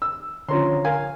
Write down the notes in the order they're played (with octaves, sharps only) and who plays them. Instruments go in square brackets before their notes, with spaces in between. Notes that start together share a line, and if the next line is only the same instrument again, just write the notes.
[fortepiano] E6
[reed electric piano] D3 C#5 A#5 [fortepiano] F3 C#4 C6
[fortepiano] A#4 F5 G#5